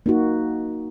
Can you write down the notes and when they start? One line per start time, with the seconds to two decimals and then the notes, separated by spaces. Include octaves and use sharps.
0.06 A#3 D#4 F#4